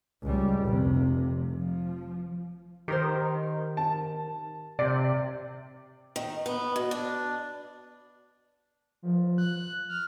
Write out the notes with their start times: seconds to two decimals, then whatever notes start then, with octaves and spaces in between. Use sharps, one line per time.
0.23 C#2 G3
0.65 F1 C3
1.50 F3
2.88 D#3 G4 A#4 C5
3.77 A5
4.79 C3 D5
6.16 D#3
6.46 B3
6.76 B2
6.91 D4
9.02 F3
9.38 F#6
9.89 F6